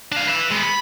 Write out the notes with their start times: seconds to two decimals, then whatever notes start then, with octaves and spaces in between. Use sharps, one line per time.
0.12 D4 F5
0.27 B4 E5
0.50 G#3 B3
0.63 B5